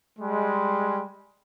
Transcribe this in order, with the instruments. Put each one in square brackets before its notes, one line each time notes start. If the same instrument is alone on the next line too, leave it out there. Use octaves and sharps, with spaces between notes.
[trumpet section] G3 G#3